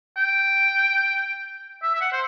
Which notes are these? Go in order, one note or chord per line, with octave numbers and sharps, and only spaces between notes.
G5
E5
E5
F#5
C5